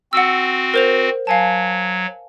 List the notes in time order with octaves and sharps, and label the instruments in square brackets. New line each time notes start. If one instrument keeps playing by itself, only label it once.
[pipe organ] C4 F#4 [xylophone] F#5 E6
[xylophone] A#4 C5 F7
[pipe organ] F#3 [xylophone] F5 G#5 A5